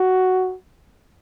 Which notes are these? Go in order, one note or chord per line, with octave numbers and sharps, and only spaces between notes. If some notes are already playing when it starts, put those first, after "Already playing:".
Already playing: F#4